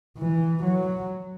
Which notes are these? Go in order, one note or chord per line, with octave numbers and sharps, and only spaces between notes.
E3
F#3